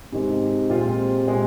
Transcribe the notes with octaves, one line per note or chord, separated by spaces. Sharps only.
G#2 C3 D#3 G#3
A#2 G#3 C4 F4
A#2 G#3 C4 F4